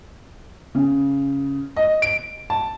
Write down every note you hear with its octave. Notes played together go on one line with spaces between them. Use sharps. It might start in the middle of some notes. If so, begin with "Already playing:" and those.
C#3
D#5
D7
A5